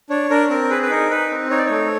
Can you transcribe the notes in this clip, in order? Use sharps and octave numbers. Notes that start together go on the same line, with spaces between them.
D4 C#5
D4 A#4
C4 A#4
G#4 B4
B4
D#4 A#4
D#4 B4
C4
D#4 C#5
D5
A3 C#5